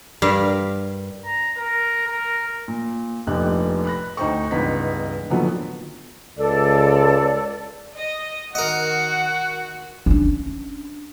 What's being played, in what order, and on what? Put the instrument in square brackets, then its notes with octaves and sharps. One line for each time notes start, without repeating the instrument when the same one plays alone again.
[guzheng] G2 G3 A#4 F5
[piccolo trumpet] A#5
A#4
A#4
[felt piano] A#2
F1 A#1 F2 G4 F#6
B5 F#6 A#6
D2 D#4 C5 G5 C#6
C#2 G2 E3 B3 D#4 B6
A#2 D3 D#3 F3 F#3 B3
[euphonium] C#2 [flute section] A4 D5
[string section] D#5
[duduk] D#3 [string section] F#4 [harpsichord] A#4 D#5 [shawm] F#5
[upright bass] C#4 D4